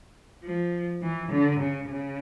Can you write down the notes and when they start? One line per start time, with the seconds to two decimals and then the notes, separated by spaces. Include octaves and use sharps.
0.44 F3
1.03 E3
1.32 D3
1.60 C#3
1.89 C#3